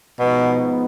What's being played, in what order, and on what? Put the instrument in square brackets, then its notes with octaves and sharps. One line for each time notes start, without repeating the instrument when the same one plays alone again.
[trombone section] G#2 F3 B3 D#4 [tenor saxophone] B2